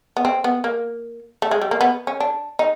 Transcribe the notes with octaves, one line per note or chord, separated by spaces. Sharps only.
B3
C4
B3
A#3
A3
G#3
G3
A#3
B3
C#4
D4
D#4